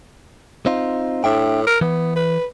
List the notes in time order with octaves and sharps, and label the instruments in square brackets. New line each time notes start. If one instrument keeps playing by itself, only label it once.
[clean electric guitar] C4 D#4 F4
[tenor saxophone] A2 [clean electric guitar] D4 E5 G5
[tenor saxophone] A#4
[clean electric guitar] E3 [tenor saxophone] B3
[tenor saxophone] B4